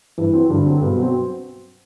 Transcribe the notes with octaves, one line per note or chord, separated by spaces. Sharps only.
G2 E3
F#3 C4
G2 D3
F#3 C4
G2 B2
F#3 C4